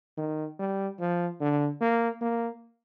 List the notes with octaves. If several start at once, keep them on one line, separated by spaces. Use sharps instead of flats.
D#3
G3
F3
D3
A#3
A#3